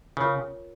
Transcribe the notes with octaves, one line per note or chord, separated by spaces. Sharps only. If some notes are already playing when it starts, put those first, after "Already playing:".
C#3 F4 A#4 C#5